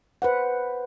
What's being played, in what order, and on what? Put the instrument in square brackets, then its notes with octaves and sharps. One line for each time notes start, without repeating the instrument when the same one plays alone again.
[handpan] B4 C5 F#5